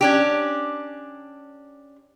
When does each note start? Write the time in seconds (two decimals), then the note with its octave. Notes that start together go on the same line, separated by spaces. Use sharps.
0.01 C#4 D4 G4